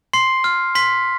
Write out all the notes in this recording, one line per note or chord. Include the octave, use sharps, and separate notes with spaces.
C6 C7
F6
C6 B6